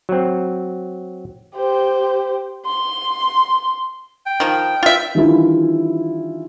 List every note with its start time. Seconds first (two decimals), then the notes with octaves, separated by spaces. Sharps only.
0.09 F#3 C4
1.56 G4 C5
2.66 C6
4.26 G5
4.40 D#3 F3
4.83 F4 E5
5.15 D#3 E3 G3 D4 E4 F4